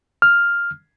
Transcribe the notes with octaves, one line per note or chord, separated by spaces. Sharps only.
F6